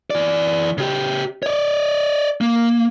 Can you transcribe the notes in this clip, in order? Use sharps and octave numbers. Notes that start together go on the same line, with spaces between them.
E3 D5
C#3 G4
C#5 D5
A#3